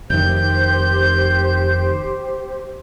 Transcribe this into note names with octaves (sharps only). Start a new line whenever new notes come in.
F1 D#3 G4 C5 G6